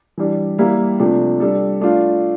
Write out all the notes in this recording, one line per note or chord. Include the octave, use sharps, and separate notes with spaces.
E3 G3 D4
G3 A#3 E4 G4
C3 F3 A3 D4
G3 D4 A4
A3 D4 F4